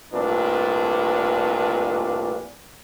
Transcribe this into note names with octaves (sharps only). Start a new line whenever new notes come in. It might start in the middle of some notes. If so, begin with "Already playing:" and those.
C2 F2 A#2 A3 D4 B4